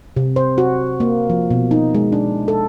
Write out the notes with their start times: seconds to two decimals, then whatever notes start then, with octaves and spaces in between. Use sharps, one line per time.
0.16 C3
0.36 C5
0.58 F#4
1.00 A#3
1.30 F3
1.50 B2
1.71 D#4
1.95 G#3
2.12 D4
2.48 A4